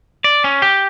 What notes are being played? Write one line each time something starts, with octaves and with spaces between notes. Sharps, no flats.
D5
C#4
G4